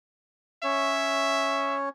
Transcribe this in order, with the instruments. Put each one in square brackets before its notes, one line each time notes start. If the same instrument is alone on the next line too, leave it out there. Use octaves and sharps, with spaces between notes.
[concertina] C#4 C#5 [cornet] E5